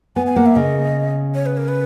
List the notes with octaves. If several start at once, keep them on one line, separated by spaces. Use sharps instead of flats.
B3 G#5
G#5
A#3 F#5
E5
C#3 D#5
C#5
B4
A#4
B4